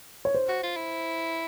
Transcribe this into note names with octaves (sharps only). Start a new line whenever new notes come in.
C#5
C5
F#4
F4
E4